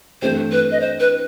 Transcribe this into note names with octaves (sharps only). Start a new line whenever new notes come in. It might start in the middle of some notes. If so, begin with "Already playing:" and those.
G2 E3 A3 C4 C5
B4
D#5
C5
B4